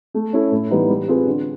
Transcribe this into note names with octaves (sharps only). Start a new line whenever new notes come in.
A3
C#4 E4 A4
A2
E3 G3 B3 D#4
G3
C4 F4 G#4 B4
D3